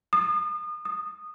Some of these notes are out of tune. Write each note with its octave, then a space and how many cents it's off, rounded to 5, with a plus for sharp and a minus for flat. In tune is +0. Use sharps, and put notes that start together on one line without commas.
D#6 -35
D#6 -15